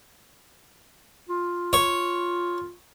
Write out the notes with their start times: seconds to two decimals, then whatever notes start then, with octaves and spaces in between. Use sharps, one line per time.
1.29 F4
1.73 C#5